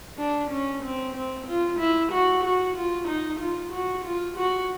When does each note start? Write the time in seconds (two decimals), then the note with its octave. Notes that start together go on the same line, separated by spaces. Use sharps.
0.18 D4
0.51 C#4
0.83 C4
1.15 C4
1.47 F4
1.79 E4
2.12 F#4
2.43 F#4
2.76 F4
3.08 D#4
3.40 F4
3.72 F#4
4.04 F4
4.37 F#4